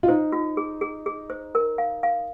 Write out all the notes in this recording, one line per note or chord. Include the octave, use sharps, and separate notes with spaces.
F4
D#4 C5
F4
G#4
G#4
G#4
C5
A#4
F5
F5